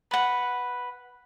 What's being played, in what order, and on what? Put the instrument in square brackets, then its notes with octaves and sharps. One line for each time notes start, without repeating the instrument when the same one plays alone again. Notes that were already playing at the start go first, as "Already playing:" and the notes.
[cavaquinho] B4 F#5